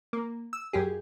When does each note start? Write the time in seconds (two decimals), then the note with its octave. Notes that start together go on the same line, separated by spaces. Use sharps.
0.13 A#3
0.53 E6
0.73 F#2 G4 G#4